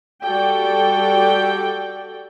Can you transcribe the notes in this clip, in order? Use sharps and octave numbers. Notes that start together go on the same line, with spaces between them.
G3 F#4 A4 D5 G5